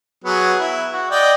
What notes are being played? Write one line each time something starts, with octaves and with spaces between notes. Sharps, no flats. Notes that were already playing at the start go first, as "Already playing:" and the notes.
F#3 B3 G#4
E4
F#4
D5 D#5 G5